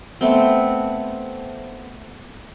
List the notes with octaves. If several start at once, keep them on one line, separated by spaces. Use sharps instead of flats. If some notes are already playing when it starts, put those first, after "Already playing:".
A3 B3 C4